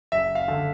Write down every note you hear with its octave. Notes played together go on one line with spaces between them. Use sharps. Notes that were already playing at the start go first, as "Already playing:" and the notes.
F#1 E5
F5
D3